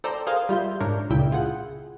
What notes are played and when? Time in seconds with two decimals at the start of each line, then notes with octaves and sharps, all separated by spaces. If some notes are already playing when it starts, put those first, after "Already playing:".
0.04 A4 C5 D5 G5 A#5
0.27 G#4 A#4 C5 F5 C6 F6
0.49 G3 F4 E5 G6
0.80 G#2 D4 A#4 C#5
1.10 C#2 A#2 C#3 E4 G5
1.32 F4 G#4 F#5